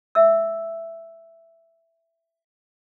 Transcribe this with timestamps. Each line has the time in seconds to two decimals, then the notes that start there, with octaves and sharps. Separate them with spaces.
0.15 E5 E6